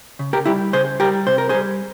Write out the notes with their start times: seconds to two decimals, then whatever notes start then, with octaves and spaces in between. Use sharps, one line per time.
0.19 C#3
0.33 G4 A#4
0.45 G3 E4 G4
0.73 C#3 G#4 C5
1.00 G3 G4 A#4
1.27 C3 C5
1.38 A#4
1.49 G3 G#4 C5